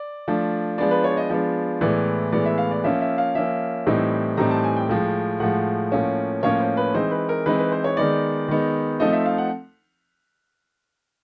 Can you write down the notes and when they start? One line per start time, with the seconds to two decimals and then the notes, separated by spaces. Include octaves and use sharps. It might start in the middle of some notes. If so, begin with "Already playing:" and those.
Already playing: D5
0.28 F3 A3 D4
0.78 F3 G#3 B3 D4 D5
0.91 B4
1.04 C#5
1.17 D#5
1.30 F3 G#3 B3 D4
1.81 A2 E3 G#3 B3 D5
2.32 A2 E3 G#3 B3 D5
2.45 E5
2.58 F5
2.71 D5
2.84 F3 A#3 C#4 E5
3.01 E5
3.18 F5
3.35 F3 A#3 C#4 E5
3.87 A2 E3 G3 C4 D#4
4.37 A2 E3 G3 C4 D#4 A#5
4.51 A5
4.64 G#5
4.77 G5
4.89 A2 F3 G#3
5.40 A2 F3 G#3 F#5
5.92 A2 F3 A#3 C#4
6.43 A2 F3 A#3 C#4 C#5
6.60 C5
6.77 B4
6.94 E3 G#3 C4 D#4 C5
7.11 B4
7.29 A#4
7.46 E3 G#3 C4 D#4 B4
7.59 B4
7.72 C5
7.84 C#5
7.97 D#3 G#3 B3 D#4 D5
8.48 D#3 G#3 B3 D#4
9.00 F3 A3 C4 D#4 D#5
9.13 E5
9.26 F5
9.38 F#5